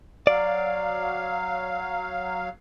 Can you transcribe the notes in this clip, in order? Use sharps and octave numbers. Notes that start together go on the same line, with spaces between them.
F#3 D5 F5